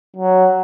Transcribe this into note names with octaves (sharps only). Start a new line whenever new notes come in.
F#3